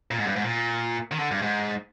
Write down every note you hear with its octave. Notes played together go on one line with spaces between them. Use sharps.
A#2
G#2
G2
G#2
A#2
D#3
D3
G2
G#2